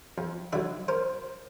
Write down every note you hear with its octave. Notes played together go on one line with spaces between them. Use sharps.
F2
D3 F#3 D5 E5
A#4 C5